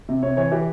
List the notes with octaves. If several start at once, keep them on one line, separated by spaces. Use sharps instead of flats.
C3
C3 C#5
E3 C#5
E3 G4